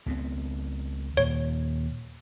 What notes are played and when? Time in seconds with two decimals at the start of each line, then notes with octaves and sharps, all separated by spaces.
0.06 C#2 B3 C4
1.17 D#2 A#2 C#5